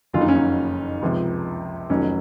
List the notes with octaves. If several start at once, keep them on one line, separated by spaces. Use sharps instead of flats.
F#1 F2 D#3 F#3 F4
D#4
C#4
D#4
C#2 C3 F3
F1 F2 D#3 F#3 C#4